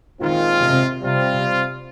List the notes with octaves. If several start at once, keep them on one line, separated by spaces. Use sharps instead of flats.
A#2 D#3 G#3 C4 F4
C3
C3 G3 C4 F4